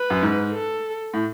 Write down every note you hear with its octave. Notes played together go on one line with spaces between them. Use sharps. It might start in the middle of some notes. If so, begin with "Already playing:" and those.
Already playing: B4
F#2
G#2
A4
A2